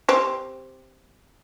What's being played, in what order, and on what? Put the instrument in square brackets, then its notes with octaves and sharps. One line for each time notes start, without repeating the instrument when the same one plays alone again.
[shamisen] C4 G4